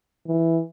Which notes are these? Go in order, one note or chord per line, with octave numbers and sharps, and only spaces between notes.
E3